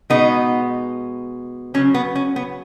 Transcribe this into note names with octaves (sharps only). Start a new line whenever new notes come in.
B2 G#3 B3 D#4
C#3 F#3 C#4
B3
C#4
B3